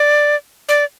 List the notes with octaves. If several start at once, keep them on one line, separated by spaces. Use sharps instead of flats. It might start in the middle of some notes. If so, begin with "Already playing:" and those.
Already playing: D5
D5